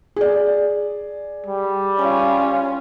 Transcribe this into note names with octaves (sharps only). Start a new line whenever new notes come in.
G#4 D5
G3
C#4 F4